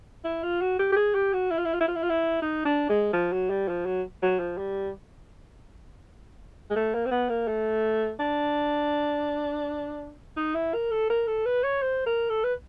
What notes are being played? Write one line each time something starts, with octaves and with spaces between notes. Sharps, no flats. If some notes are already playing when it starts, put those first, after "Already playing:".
E4
F4
F#4
G4
G4
G#4
G4
F#4
E4
F4
E4
F4
E4
F4
E4
F4
E4
D#4
D4
G#3
F3
F#3
G3
F3
F#3
F#3
F3
G3
G#3
A3
A#3
C4
B3
A#3
A3
D4
D#4
E4
A#4
A4
A#4
A4
B4
C#5
C5
A#4
A4
B4